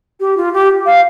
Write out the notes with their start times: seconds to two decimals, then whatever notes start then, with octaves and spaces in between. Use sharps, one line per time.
0.20 G4
0.37 F4
0.53 G4
0.86 F5